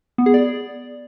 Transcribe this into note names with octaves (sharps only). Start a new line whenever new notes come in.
B3
G#4
D5